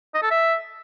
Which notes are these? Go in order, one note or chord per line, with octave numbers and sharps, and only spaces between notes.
D#5
A4
E5